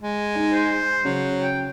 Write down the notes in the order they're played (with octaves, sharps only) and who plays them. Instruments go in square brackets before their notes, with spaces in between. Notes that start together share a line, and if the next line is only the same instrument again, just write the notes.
[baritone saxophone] G#3
[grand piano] D#4
[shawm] C5
[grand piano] C#3 [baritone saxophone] F#3
[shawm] G5